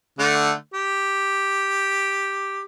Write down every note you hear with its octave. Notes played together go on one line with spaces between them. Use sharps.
D3 A3
G4